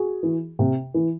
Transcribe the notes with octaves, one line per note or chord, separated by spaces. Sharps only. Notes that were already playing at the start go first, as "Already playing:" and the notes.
Already playing: F#4 G#4
E3
C3
E3